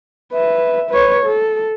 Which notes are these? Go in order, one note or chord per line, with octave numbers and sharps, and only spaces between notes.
B4 E5
B4 C#5
A4